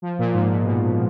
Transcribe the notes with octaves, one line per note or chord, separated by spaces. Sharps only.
F3
A#2
G#2
A#2
B2